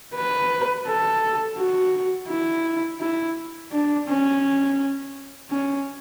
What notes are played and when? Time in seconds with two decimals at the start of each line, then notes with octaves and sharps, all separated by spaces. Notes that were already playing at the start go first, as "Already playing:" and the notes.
0.15 B4
0.86 A4
1.58 F#4
2.29 E4
3.00 E4
3.71 D4
4.07 C#4
5.50 C#4